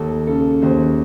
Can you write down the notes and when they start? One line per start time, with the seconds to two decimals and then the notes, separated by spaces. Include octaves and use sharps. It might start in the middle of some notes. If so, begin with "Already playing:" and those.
Already playing: D#2 A4
0.27 C#3 A4
0.62 D#2 C5